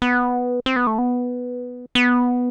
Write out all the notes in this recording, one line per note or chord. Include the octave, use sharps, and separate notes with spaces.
B3
C4
B3
A3
B3
B3